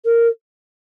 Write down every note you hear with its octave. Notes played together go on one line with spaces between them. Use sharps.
A#4